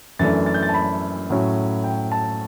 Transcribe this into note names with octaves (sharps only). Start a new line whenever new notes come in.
F#2 E3 A3 D4 A6
A6
G6
A6
A5
B5
A2 F#3 C#4
G5
A5